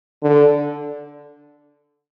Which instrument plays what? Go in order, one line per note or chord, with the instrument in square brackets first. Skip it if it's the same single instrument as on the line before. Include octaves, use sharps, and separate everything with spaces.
[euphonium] D3